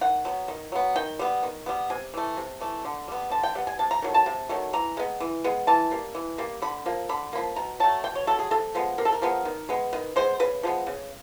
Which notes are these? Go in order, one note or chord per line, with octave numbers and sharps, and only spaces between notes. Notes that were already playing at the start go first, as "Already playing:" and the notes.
D#3 F#5
F#3 B3
D#3
F#3 B3
D#3 G5
G3 B3
D#3
G3 B3
C3 G#5
E3 A3
C3
E3 A3
D3
G3 B3
D3 A5
G5
G3 B3 F#5
G#5
C3 A5
A#5
D#3 F#3 A3
A5
C3
D#3 F#3 A3
E3 A#5
G#3 B3
E3
G#3 B3
E3 A5
G3 A#3
E3
G3 A#3
D3 B5
F3 A#3
D3 B5
F3 A#3 B5
B2 A#5
F#3 A3 A5
B2 G5
C#5
F#3 A3 A4
G#4
C3 A4
F3 G#3 B3
C3 A#4
A4
A#4
F3 G#3 B3
D#3
G#3 B3
D#3 B4
G#3 B3 C5
C#3 B4
F3 G#3 B3
C#3